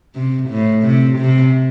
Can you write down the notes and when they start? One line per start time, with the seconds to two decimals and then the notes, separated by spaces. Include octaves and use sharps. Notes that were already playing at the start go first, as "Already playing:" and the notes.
0.15 C3
0.49 A2
0.83 C3
1.18 C3